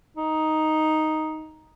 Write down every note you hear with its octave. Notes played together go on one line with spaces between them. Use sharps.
D#4